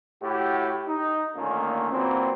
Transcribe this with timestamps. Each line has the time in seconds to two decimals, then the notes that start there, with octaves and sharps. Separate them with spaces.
0.22 A2 E4 F#4 G4
0.87 D#4
1.36 A#2 D3 D#3 A3 A#3 C#4
1.91 A#2 E3 F#3 A#3 C4